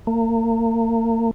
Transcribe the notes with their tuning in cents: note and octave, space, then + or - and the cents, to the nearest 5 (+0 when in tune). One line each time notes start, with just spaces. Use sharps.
A#3 -35